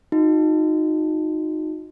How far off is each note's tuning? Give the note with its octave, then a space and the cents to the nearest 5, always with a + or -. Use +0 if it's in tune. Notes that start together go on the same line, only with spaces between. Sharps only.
D#4 +0 F#4 -40